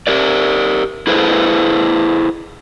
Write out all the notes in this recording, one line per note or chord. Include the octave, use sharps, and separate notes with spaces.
G4 A#4 D5
E4 G#4 A4 B4 C5